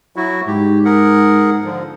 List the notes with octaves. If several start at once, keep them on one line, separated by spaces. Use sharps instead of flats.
F#3 E4 F#4
G#2 G4
G#4 A#4 F#5
D3 F3